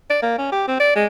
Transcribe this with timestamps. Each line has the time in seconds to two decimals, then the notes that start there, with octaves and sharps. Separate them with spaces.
0.10 D5
0.22 A#3
0.38 C#4
0.52 G4
0.68 C4
0.80 D5
0.96 G#3